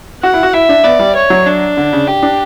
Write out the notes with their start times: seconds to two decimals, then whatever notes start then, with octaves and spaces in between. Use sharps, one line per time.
0.23 F#4 F#5
0.34 E4
0.43 F#4
0.54 E4 E5
0.69 D4
0.84 B3 D5
0.99 G3
1.16 C#5
1.30 F#3
1.46 D4
1.77 D3
1.93 C#3
2.08 G4
2.23 D4